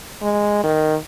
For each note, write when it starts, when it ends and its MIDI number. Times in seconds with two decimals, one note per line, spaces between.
0.22 0.61 56
0.64 0.95 51